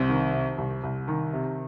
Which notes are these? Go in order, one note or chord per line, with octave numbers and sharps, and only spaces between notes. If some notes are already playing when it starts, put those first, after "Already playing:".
Already playing: C2 C4
D#3
C3
C2
C2
D#3
C3